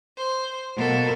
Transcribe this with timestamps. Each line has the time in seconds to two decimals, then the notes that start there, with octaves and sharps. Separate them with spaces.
0.16 C5
0.76 B2 A#3 A4